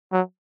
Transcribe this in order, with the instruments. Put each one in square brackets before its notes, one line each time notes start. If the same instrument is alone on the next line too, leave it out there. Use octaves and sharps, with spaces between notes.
[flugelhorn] F#3